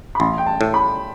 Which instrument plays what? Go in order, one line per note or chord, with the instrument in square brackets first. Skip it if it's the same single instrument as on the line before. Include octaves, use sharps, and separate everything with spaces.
[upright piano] B5
[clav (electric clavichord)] A1 [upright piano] C6
[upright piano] G5
A5
[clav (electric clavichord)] A2
[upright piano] B5